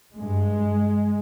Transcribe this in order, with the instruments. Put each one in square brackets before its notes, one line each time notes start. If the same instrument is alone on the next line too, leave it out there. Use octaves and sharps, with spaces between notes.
[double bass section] G2 G#3